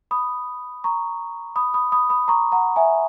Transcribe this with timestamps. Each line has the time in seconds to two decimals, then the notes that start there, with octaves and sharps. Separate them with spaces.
0.11 B5 D#6
0.84 A#5 C#6
1.56 B5 D#6
1.74 B5 D#6
1.92 B5 D#6
2.10 B5 D#6
2.28 A#5 C#6
2.52 F#5 A#5
2.76 E5 G#5